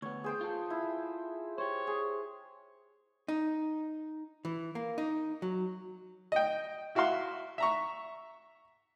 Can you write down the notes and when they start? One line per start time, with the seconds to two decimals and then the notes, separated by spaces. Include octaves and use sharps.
0.02 D2 B3 C#5
0.24 G#4 C5 G5
0.41 F4 A4
0.70 E4
1.58 G4 C5 C#5
1.87 G#4
3.28 D#4
4.45 E3
4.75 A#3
4.98 D#4
5.42 F#3
6.32 D#5 G5
6.95 E4 F#4 E5 F5 C6
7.58 E5 A#5 C#6